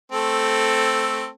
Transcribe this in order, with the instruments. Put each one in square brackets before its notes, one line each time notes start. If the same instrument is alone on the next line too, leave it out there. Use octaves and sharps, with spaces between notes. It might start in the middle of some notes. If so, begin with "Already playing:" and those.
[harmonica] A3 C4 A4